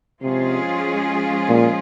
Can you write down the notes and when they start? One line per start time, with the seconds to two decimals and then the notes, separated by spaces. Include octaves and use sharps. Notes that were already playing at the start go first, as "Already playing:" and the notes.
0.22 C3 F3 G#3 C#4 F4 G#4
1.49 A#2